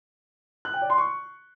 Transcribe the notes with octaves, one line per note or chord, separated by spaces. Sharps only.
F#6
G5
D5
C6
C#6